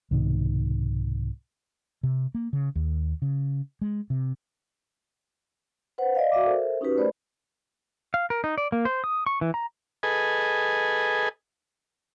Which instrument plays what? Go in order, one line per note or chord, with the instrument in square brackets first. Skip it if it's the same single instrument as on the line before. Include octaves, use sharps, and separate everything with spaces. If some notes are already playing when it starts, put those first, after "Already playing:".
[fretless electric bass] C2 G#2 B2 D#3
C3
A#3
C#3
D#2
C#3
G#3
C3
[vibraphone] B4 C5 F#5
D5 D#5 F5
F#4 D5 E5 F5 D6
A4 A#4 C5 E5
C#4 D#4 F#4 G4 B4
A3 A#4 C5 D5 B5
[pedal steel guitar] F5
A#4
D#4
D5
A#3
C5
D#6
C#6
E3
A#5
[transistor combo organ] G#4 A4 B4 D#5 G#5